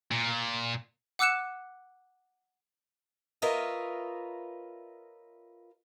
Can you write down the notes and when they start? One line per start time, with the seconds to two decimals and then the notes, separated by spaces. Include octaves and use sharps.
0.11 A#2
1.19 F#5 D6 E6 F#6 C#7 E7
3.42 F4 A#4 B4 C#5 D#5 E5